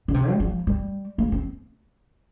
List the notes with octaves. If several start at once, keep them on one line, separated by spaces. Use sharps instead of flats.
D3
C3
G3
F3
G3
A#3
C4